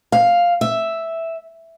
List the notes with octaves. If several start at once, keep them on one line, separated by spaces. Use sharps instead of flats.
F5
E5